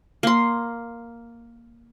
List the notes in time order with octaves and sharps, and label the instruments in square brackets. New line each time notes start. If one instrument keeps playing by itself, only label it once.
[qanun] A#3 C6